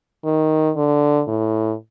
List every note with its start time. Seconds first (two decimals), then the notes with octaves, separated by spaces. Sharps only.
0.25 D#3
0.76 D3
1.28 A2